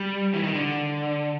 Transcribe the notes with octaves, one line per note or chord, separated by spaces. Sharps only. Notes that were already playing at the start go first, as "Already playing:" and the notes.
Already playing: G3
E3
D#3
D3